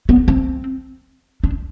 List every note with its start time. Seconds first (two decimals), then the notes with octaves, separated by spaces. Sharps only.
0.09 B3
0.28 C4
1.44 D4